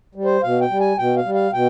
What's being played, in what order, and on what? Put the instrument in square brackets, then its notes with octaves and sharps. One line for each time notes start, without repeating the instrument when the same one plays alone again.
[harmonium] G3
C5
B2 F5
G5
G3
G#5
B2 G5
F5
G3
F5
B2 G5